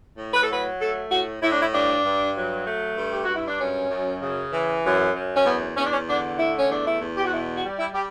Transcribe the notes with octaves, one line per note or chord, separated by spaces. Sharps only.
A2
B4
A4
F#3 B4
A3 A4
A2 F#4
A2 E4
D4
E4
G2 D4
G2
F#3
A3
G2
G4
G2 F#4
E4
D4
F#2 C#4
F#2
C#3
E3
F#2
F#2
C#4
E2 B3
E2 C#4
D4
C#4
D3 D4
A3 E4
C#4
E2 D4
E4
E2
G4
F#4
B2 E4
F#4
G3
E4
G3 G4